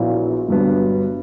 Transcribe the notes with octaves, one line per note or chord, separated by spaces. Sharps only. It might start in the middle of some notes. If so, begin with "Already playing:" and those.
Already playing: A#1 A#2 F#3 B3 E4
G1 G2 F#3 B3